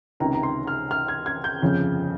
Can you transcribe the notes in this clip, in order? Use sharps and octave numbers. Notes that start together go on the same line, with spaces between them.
C#2 C3 D#3 A#5
A#5
C6
F6
F6
G#6
G#6
G6
G1 F2 C#3 F3